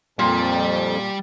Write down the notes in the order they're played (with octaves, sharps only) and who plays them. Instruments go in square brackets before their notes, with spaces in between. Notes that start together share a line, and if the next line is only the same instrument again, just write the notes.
[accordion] F2 [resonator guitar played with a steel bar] A#2 [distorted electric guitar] G3 G4